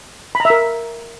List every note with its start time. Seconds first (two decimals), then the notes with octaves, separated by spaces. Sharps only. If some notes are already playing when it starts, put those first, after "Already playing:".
0.35 B5
0.40 A#5
0.45 E5
0.50 A#4